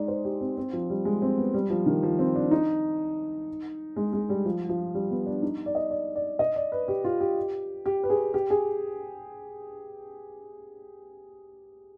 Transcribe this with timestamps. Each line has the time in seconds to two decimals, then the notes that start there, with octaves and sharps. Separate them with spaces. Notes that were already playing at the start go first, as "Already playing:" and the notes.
Already playing: G#3 D#4 D5
0.08 C5
0.25 G4
0.41 C4
0.57 C4
0.73 F3
0.90 G3
1.05 G#3
1.22 C4
1.38 B3
1.54 G3
1.70 F3
1.86 D#3
2.03 F3
2.19 C4
2.35 D4
2.51 D#4
3.96 G#3
4.13 G#3
4.29 G3
4.45 F3
4.69 F3
4.94 G3
5.10 B3
5.26 D4
5.42 D#4
5.66 D5
5.75 D#5
5.91 D5
6.16 D5
6.39 D#5
6.56 D5
6.72 B4
6.88 G4
7.04 F4
7.21 G4
7.86 G4
8.03 B4
8.10 G#4
8.34 G4
8.50 G#4